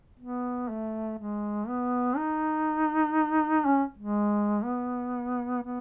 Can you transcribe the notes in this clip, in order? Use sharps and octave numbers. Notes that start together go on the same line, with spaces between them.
B3
A3
G#3
B3
D#4
C#4
G#3
B3
B3